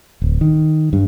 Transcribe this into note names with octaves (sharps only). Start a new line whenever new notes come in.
D1
D#3
G2